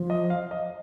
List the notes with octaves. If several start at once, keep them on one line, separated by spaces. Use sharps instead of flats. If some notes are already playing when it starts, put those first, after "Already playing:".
Already playing: F3
D#5
F5
D#5